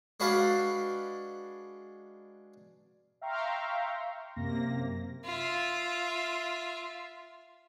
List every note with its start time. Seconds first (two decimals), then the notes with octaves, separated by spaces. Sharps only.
0.20 G#3 D4 F#4 B4 D5 F5
3.21 E5 F5 G5 A#5 C6 C#6
4.36 F#2 C3 A#3 A#6
5.25 F4 E5